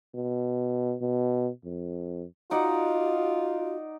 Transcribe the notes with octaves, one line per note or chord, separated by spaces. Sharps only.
B2
B2
F2
D#4 F4 F#4 D5 F#5